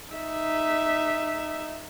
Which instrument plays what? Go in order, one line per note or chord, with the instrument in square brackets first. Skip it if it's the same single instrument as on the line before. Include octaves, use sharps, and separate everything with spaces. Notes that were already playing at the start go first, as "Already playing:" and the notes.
[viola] D#4 E5